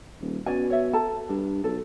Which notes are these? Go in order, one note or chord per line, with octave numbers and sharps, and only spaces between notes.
D#1
B2 C#4 D5 G#5
C#5 E5
A4 A5 A#5
G2 D4
B1 A4